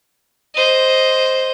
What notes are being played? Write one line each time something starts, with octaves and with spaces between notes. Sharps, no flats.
C5 D#5